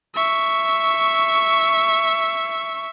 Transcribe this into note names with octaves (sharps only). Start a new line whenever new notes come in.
E5 C#6